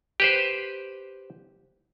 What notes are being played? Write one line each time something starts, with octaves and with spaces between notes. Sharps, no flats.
G4 B4 C5